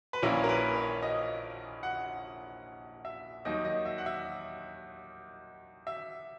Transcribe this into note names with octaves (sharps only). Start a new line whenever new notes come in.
B4
A#1 A#2 A#3 C#4 E4 A#4
A#4
B4
C#5
D#5
F#5
E5
D#2 D#3 F#3 D#5
D#5
E5
F#5
E5
E5